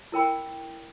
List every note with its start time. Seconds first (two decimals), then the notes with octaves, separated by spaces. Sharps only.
0.12 E4 A#4 G5 B5